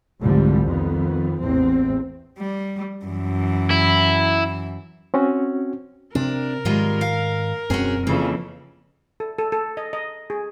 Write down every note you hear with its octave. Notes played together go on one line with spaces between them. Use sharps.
F1 C2 G#2 D3 F3 G3
F2 D#3 B3
A1 E2 A2 C4
G3
F#2 E3
E4
C4 C#4 F#4
C3 C4 D4 A#4
G#2 D#3 G3 G#3 F4
F5
E1 F#2 C4 C#4 F#4 G#4
F2 C#3 E3 A#3
A4
A4
A4
D#5
D#5
G#4